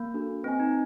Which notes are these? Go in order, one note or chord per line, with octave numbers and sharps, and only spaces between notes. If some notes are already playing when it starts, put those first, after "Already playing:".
Already playing: A#3
D4 F#4 A4
C4 B4 D#5 G#5
D#4